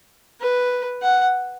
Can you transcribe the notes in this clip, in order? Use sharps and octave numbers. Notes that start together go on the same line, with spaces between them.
B4
F#5